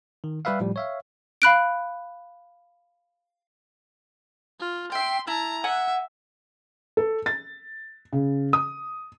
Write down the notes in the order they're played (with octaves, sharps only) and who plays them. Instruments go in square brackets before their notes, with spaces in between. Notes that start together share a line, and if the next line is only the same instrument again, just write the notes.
[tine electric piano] D#3
G3 G4 B4 E5 F5
A2 F3 G3
C#5 E5 F5
[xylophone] F5 B5 F#6 D7
[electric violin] F4
[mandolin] E5 G5 [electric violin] C6 C7
[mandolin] E4 [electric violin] A5 A#5
[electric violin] E5 [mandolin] F#5 G#5 F#6
[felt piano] A4
A6
C#3
D#6